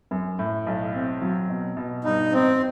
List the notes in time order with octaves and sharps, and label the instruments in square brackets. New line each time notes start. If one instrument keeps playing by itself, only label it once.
[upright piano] F#2
A2
B1
C4
F#3
B2
B2
[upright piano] G2 [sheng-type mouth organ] D#4
[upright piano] A1 [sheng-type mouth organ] C4